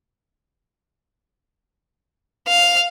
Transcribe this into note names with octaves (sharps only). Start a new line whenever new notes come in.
F5